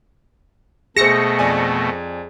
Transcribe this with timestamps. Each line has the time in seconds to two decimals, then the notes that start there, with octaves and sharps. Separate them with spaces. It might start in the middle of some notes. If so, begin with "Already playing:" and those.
0.97 B2 A3 G#4 C5 A#6 C#7 E7
1.39 F2 D5 G#5